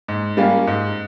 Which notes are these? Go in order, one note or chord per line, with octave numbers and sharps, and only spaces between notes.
G#2
G3 A#3 C#4 F4
G#2